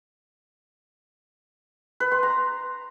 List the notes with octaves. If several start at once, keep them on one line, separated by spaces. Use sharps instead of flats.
B4
C6
A#5